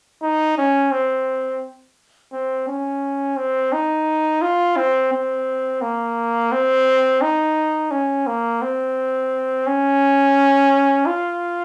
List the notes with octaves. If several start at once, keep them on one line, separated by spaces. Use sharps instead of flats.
D#4
C#4
C4
C4
C#4
C4
D#4
F4
C4
C4
A#3
C4
D#4
C#4
A#3
C4
C#4
F4